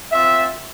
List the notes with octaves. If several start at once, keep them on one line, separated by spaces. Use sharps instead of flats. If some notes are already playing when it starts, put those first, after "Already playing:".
C4 F4 E5